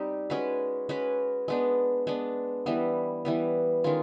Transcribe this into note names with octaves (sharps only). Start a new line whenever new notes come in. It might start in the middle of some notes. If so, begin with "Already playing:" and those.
Already playing: G3 C4 D#4 G4
G#3 C#4 F#4 B4
G#3 C#4 F#4 B4
G#3 B3 D4
G#3 B3 D4
E3 G3 B3
E3 G3 B3
D#3 G#3 C#4 F4